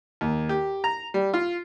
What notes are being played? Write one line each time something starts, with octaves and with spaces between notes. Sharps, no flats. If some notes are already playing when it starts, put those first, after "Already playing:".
D#2
G4
A#5
G3
F4